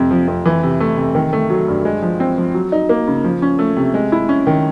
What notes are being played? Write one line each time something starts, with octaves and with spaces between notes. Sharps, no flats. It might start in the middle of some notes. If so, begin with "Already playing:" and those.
Already playing: F2 C3
F3
F2
E3
C3
A3
C3
D#3
A3
F#3
G2
G#3
F3
C4
F3
F#3
D#4
A#3
C#3
F3
C#4
A3
C3
G#3
E4
C#4
D#3